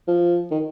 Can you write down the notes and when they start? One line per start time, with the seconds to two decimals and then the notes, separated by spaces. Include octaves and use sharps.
0.08 F3
0.51 D#3